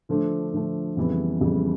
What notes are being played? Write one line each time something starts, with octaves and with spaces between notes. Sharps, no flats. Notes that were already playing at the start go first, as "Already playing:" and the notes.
D3 F3 A3 D4
D3 F3 A3 D4
F2 C#3 E3 G3 B3
F2 C#3 E3 G3 B3